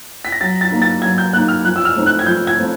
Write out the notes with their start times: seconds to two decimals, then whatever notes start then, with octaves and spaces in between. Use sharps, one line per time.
0.25 B6
0.32 A#6
0.41 F#3 A6
0.61 A6
0.71 A#3 D#4
0.82 A6
1.02 F#3 G#6
1.18 G6
1.33 A#3 F#6
1.37 D#4
1.48 F6
1.65 F3 F#6
1.76 E6
1.85 F6
1.95 A3 C4 D#4
2.06 F#6
2.19 G#6
2.26 F3 G6
2.47 G#6
2.58 A3 C4